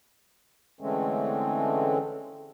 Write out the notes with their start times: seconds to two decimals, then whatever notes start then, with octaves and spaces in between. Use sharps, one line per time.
0.81 D3 E3 G#3 A3 C4 C#4